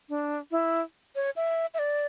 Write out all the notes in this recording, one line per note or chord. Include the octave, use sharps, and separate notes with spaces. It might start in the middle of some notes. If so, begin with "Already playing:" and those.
D4
E4
C#5
E5
E5
D5